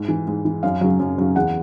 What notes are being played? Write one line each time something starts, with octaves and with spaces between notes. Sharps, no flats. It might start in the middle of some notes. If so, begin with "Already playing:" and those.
Already playing: G#2
E3
G#2
E3
F#2 F5
C#3 F#3
F#2
C#3 F#3
E2 F#5